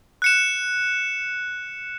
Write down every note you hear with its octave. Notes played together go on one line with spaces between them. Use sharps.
F#6 C#7 E7